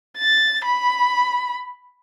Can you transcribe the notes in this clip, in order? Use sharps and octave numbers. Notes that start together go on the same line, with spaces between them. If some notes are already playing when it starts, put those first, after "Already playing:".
A6
B5